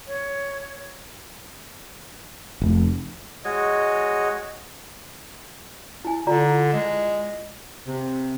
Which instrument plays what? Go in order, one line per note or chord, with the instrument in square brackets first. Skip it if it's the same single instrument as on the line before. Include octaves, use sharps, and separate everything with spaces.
[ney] C#5
[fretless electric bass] F1
[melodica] G#3 F#4 C#5 D#5
[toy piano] E4 G#5
[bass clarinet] D3 [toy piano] F4 D5 A#5
[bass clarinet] G#3
[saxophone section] C3